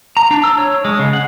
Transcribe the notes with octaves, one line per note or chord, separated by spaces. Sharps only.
A#5
D4
E6
C#5
G#3
C#3
F#5